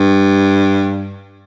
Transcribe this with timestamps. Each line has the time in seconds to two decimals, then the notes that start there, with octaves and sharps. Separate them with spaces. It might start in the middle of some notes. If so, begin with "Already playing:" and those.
Already playing: G2